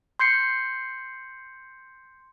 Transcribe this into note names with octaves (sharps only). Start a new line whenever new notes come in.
C6 G6 C7 C#7